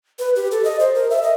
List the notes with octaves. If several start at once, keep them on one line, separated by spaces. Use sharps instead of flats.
B4
G4
A4
D#5
C5
A#4
E5
D#5